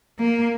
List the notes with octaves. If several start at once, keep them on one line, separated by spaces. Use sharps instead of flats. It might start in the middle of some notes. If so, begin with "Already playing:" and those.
A#3